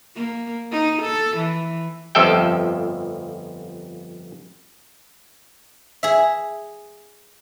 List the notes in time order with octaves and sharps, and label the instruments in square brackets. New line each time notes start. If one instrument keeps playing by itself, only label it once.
[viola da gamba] A#3
D#4
A4
E3
[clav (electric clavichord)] G1 F2 F3 A4 E5 G5
[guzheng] G#4 E5